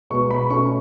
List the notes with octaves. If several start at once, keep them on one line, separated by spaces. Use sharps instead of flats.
B2 G#3 B3 C#6
B5
B2 A3 C#4 C#6